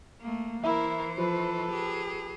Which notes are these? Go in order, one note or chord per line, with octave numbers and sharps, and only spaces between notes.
A3 A#3
E3 E4 A#4 C5 E5
F3 A4 B4
G4 G#4